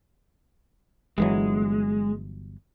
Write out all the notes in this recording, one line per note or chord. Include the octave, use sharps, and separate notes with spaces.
G1 E3 F#3 G#3